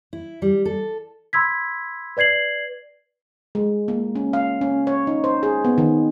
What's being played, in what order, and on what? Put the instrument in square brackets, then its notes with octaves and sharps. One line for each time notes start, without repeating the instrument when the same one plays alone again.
[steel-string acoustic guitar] E4
G3
A4
[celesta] B5 C6 E6 G#6 B6
B4 D5 G#6 C7 F#7
[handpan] G#3
A#3
C#4
F5
C#4
C#5
D#4
C5
G#4
B3
D#3